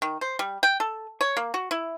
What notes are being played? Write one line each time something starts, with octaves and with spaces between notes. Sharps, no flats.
D#3
C5
G3
G5
A4
C#5
A#3
F#4
E4